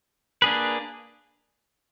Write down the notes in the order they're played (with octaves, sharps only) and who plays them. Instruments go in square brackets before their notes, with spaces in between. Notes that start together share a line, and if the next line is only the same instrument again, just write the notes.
[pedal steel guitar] A#3 D4 G#4 B4